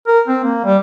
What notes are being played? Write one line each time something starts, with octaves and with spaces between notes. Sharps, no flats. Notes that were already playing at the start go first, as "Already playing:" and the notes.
A#4
C4
A#3
G3